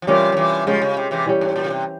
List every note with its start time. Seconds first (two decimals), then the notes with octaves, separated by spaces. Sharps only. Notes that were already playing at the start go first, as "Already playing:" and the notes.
0.02 F3
0.07 C3 E3 G3 C#4 F4 A#4
0.32 F3
0.37 C3 E3
0.67 C#3 F3 G#3 C#4 G4
0.82 C#3
0.97 C3
1.11 C3 E3
1.26 E3 G3 C#4 G4
1.41 G#2
1.56 A#2
1.64 C#3
1.70 C3